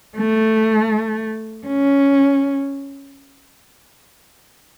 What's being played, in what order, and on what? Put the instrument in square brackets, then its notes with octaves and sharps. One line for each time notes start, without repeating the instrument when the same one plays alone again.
[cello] A3
C#4